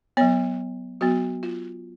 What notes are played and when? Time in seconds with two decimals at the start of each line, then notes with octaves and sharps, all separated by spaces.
0.17 F#3 B3 C#5
1.01 F#3 B3 F#4
1.43 F4